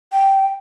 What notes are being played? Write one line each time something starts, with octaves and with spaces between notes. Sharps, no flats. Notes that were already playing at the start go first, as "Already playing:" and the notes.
G5